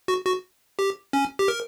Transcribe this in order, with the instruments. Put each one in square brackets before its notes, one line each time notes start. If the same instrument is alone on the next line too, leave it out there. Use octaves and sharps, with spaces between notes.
[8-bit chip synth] F#4
F#4
G4
C#4
G4
A#4